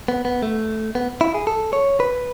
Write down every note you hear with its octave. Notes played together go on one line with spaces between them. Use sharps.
B3
B3
A3
B3
E4
G#4
A4
C#5
B4